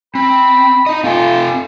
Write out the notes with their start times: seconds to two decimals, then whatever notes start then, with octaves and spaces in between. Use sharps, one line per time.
0.15 C4 B5
0.86 D#4 D#5
1.04 C4 F4 A4 G#5